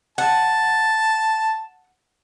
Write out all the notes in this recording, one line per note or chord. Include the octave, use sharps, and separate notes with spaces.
F#5 A5